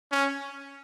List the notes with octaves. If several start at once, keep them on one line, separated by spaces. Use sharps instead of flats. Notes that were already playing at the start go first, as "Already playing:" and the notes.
C#4